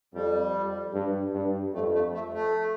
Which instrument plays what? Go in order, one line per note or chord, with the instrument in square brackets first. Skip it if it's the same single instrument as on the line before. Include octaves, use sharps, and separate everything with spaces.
[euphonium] F2 [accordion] G3
[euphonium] G2
G2
[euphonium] F2 [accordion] A3
[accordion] A3
A3
A3